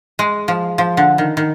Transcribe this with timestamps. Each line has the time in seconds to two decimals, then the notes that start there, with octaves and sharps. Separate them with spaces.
0.19 G#3
0.48 F3
0.78 F3
0.97 D3
1.18 D#3
1.37 D#3